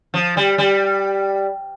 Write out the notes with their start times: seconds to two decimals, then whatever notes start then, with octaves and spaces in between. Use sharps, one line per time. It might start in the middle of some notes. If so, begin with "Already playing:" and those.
0.14 F3
0.37 G3
0.58 G3